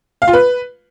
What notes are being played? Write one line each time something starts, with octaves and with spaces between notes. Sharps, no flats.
F5
F4
B4